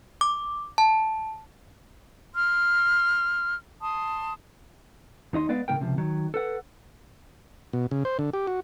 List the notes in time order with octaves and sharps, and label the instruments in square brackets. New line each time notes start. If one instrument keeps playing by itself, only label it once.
[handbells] D6
A5
[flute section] C6 F6
A5 C6 D#6
[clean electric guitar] D#2 D#4 D#5 C6
G#3 B3 B4 D5 D#5 F5
A2 C#3 C4 A#4 G5
C#2 C3 F3
D#3 F#3
A4 B4 F#5
[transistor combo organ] B2
C#3
C5
D3
G4
F#4